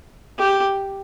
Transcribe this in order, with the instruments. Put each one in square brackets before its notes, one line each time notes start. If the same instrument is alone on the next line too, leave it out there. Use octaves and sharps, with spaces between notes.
[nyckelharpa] G4